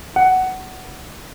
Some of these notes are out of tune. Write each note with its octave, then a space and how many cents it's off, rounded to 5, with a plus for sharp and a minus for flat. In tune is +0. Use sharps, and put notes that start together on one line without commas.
F#5 +15